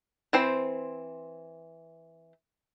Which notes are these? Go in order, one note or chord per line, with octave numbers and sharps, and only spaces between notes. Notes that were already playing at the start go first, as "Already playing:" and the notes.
E3 C4 C5